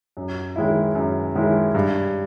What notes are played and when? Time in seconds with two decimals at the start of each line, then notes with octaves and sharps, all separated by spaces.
0.17 F#2
0.56 D#3 G#3 C#4 E4
0.95 F#2
1.35 D#3 G#3 C#4 E4
1.75 G2